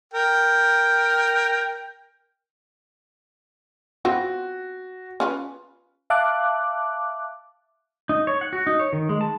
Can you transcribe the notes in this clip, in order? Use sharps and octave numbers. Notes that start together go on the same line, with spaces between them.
A#4 G5
B3 C4 F4 F#4
C#4 F4 B4
E5 F5 A5 D6 F#6
D#4
C#5
F#5
F#4
D#4
C#5
D#3
G#3
A5